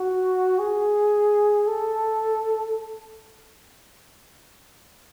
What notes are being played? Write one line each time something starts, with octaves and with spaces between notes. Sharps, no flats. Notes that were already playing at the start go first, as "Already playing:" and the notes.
Already playing: F#4
G#4
A4